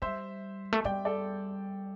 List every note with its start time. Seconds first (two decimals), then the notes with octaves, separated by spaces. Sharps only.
0.02 G3 C5 E5
0.73 A3
0.84 G3 D5 G5
1.05 A4 D5